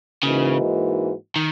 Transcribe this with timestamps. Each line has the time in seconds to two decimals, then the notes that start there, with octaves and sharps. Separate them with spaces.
0.23 G#2 C#3 E3 A#3 D#4 F#4
1.36 D#3